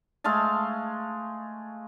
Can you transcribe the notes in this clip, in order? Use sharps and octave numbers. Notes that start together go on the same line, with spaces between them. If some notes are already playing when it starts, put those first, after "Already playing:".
G#3 A3 F5 A5